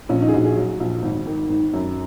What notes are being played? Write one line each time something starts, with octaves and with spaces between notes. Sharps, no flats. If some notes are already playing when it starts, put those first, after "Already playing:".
A#1 C#4
D#4
G#4
A#1 F#4
G#4
F#3
A#1
G#1
D#3
G#1
F#2